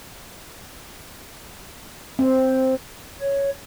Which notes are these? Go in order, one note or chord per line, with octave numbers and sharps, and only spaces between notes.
C4
C#5